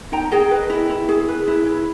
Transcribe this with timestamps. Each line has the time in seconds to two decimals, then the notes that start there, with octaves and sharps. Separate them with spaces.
0.12 D#4 G5 A#5
0.31 G#4 D#5 G5
0.51 B4
0.70 E4
0.90 E4
1.09 G#4
1.28 B4
1.48 E4
1.66 E4